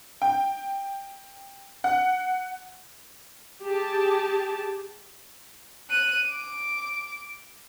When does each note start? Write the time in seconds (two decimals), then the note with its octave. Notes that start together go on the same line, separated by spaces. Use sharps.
0.22 G5
1.84 F#5
3.64 G4 G#4 A5
5.90 F#6 D#7
6.27 D6